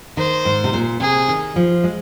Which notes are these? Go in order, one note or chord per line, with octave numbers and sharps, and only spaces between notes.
D#3 C5
G#2
C3
A#2
C3 G#4
D#3
F3
G#3